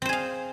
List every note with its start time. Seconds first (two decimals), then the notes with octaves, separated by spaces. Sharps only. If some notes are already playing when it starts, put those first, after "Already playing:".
0.02 C4
0.05 C5
0.09 G#4
0.13 F5